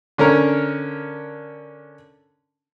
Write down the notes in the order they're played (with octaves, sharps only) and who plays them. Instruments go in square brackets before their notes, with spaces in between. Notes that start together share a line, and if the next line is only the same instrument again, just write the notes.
[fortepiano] D3 C#4 A#4 A#5